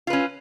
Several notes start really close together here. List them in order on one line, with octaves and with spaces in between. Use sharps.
F4 B4 C#4